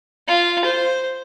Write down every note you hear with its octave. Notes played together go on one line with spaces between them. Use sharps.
F4
C5